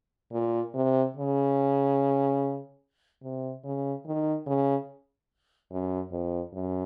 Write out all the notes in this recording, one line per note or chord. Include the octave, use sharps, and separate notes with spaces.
A#2
C3
C#3
C3
C#3
D#3
C#3
F#2
F2
F#2